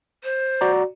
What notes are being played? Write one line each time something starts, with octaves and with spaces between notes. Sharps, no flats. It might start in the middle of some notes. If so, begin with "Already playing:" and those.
C5
F#4 D5 A#5